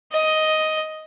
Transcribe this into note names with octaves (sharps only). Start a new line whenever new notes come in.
D#5